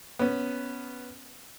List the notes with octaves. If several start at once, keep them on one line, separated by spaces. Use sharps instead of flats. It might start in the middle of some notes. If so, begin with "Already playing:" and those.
B3 C#4